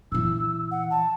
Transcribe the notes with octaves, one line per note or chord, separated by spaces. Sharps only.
A#2 E3 E6
F#5
A5